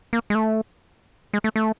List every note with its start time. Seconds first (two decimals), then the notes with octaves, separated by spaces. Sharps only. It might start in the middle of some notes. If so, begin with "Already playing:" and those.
0.13 A#3
0.30 G#3
0.35 A3
1.34 G#3
1.44 A3
1.56 A3